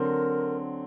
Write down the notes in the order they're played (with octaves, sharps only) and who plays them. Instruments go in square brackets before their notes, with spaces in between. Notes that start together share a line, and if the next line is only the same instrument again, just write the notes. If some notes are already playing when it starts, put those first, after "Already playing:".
Already playing: [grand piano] D3 F#3 C4 [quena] A#4